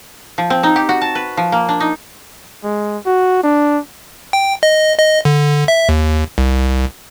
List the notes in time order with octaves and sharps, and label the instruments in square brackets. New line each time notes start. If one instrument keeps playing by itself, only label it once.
[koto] F3
C4
D#4
G4
F#4
A5
B4
F3
A#3
D4
D#4
[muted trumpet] G#3
F#4
D4
[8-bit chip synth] G5
D#5
D#5
D3
E5
D#2
C2